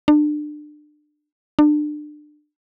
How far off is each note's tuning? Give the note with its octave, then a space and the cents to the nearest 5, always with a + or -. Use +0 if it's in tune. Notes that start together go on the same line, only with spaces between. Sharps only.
D4 +30
D4 +30